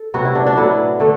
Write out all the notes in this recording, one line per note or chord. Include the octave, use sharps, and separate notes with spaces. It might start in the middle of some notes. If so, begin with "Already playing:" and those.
Already playing: A4
C3 F#3 B3 F#4
E4
D4
D4
A2 F#3 B3 E4
D3 A3